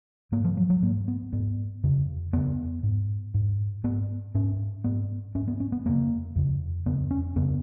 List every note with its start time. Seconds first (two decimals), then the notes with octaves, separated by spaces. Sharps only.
0.32 G#2 A#3
0.44 F3
0.57 F#3
0.70 F#3
0.82 G#2 A#3
1.08 B3
1.33 G#2 B3
1.84 F2 C#3
2.33 F2 C#3 B3
2.83 G#2
3.34 G#2
3.84 G#2 B3
4.35 G#2 C#4
4.84 G#2 B3
5.35 G#2 C#4
5.48 B3
5.60 C#4
5.72 B3
5.85 F2 C#3 A#3
6.36 F2 C#3
6.86 F2 C#3 B3
7.11 C#4
7.36 F2 C#3 B3